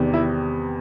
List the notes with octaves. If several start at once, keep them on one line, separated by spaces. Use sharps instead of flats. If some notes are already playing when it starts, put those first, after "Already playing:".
Already playing: E2 C3 D#3 G3 B3
E4